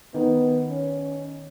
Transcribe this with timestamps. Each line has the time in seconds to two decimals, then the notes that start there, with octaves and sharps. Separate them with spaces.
0.14 D#3 B3
0.69 C#4